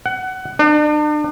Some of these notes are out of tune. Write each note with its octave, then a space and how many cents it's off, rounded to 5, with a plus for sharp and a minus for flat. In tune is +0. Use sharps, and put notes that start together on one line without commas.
F#5 +20
D4 +40